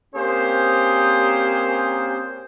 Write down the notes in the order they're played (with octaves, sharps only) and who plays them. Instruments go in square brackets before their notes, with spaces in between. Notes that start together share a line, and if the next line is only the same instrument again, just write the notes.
[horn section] A#3 C4 C#4 G4 G#4 C5